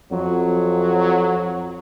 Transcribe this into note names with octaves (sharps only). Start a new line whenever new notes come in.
F2 F#3